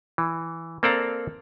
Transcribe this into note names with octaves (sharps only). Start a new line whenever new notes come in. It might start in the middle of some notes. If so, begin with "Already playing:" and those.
E3
A#3 C4 A4 D5 F5 A#5